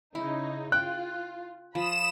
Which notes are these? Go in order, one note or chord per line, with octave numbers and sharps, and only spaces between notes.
C#3 D#4 E4
F4 G5 F#6
F3 B5 D#6 E7